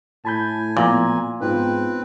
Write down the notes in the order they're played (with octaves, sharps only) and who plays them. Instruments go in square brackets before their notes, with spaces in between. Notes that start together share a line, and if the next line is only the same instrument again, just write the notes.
[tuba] A2 [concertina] G#5 [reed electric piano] A5 B5 G6
[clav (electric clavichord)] A#2 [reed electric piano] F3 B3 A#5
[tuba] G#2 [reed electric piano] B3 D#4 F4 [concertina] C4 B4